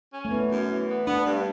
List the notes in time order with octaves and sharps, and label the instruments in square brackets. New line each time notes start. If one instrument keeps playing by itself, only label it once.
[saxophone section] C#4
[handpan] A3
[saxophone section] E3 [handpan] B3
[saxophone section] F#2
E3
B3
[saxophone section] B3 [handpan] D4
[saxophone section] G2